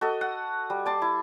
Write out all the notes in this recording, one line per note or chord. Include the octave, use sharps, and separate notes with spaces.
F#4 A4 D#5
F#5
G3
D5 A5 C6
E4